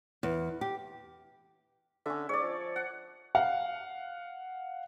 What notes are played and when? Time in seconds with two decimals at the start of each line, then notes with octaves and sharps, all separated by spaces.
0.23 E2
0.61 G4
2.06 D3 C#4 E5
2.29 G#2 C#5 D5
2.43 F3
2.76 F#5
3.35 F5 F#5